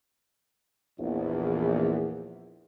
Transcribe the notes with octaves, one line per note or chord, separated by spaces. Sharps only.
A#1 E2